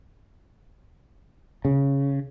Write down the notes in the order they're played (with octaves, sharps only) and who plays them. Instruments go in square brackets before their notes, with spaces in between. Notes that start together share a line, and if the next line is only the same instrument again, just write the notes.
[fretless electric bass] C#3